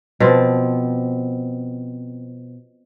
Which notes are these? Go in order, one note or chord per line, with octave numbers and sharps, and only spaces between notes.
B2 F3 C4